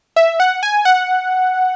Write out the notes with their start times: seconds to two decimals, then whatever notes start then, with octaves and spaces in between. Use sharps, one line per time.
0.16 E5
0.40 F#5
0.63 G#5
0.85 F#5